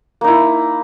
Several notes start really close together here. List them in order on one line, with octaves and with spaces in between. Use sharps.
A#3 D#4 E4